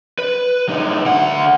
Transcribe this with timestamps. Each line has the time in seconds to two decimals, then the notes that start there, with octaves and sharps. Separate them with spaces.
0.19 B4
0.69 A2 D#4
1.06 D2 F#5